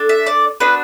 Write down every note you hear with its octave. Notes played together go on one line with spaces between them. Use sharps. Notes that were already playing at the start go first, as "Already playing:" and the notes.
Already playing: D4 A4
E5
D5
B3 D4 F#4 B4